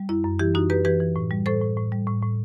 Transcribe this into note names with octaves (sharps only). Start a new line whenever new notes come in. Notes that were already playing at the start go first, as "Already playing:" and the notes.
Already playing: G3
F#2 E4
F#2
E3 E4 G4
F#2 D#4 F#4
F#2 G4 B4
E3 G4 B4
E3
A2
G3
A2 A4 C5
A2
A2
G3
A2
A2